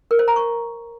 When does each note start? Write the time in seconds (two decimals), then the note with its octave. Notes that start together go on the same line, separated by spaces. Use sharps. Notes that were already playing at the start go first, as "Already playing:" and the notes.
0.11 A#4
0.19 C5
0.28 A#5
0.36 C#6